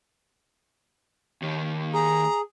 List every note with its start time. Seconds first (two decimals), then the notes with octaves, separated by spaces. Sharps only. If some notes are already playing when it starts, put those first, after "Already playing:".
1.42 D#2 D#3
1.94 G#4 A#5